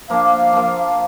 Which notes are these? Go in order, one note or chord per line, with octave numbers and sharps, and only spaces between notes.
F3 A#3 D4 F5
F3 A#3 D4